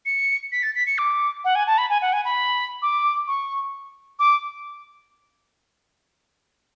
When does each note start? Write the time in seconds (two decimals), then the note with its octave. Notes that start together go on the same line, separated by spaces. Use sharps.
0.06 C#7
0.52 B6
0.63 A6
0.75 B6
0.87 C#7
0.98 D6
1.45 F#5
1.55 G#5
1.67 A5
1.78 B5
1.90 G#5
2.02 F#5
2.13 G#5
2.25 B5
2.82 D6
3.27 C#6
4.19 D6